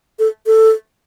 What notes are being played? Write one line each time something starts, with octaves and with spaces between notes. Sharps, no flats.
A4
A4